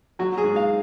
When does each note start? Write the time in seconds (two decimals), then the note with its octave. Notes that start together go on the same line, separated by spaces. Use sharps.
0.19 F#3 F#4
0.37 G#4
0.44 G#2
0.56 F5